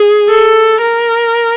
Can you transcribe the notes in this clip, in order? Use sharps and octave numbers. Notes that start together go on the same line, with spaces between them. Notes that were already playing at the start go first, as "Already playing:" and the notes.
Already playing: G#4
A4
A#4